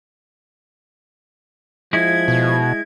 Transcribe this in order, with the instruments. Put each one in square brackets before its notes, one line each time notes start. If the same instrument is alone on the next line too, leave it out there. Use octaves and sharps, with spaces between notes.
[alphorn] F3 [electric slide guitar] G#3 E4 [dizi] G#6
[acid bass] B2